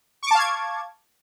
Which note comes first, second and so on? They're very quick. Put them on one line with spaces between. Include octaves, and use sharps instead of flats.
C#6 D6 A5 F5 G#6